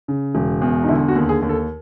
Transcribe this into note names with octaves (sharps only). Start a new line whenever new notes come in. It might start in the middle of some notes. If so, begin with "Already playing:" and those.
C#3
E1
E2
D#4
D3 E4
F#4
D#2
G#4
D#2
A4